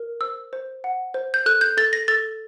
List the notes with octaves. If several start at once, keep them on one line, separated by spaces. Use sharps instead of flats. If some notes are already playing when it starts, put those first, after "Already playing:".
Already playing: A#4
C5 E6
C5
F#5
C5
G6
A4 F#6
G6
A4 A6
A#6
A4 A6